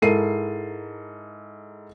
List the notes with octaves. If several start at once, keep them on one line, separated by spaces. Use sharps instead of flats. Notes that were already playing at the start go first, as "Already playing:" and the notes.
G#2 E4 A4 A#4 C7 D#7